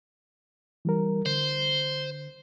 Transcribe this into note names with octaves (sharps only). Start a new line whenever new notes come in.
E3 G3 A#4
D3 C5